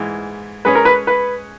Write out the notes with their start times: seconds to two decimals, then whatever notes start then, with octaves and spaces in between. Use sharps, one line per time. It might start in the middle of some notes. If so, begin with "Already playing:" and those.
Already playing: G#2 E3 G#3
0.65 G#3 C#4 G#4 B4 C#5
0.75 A#4
0.85 B4
1.07 B4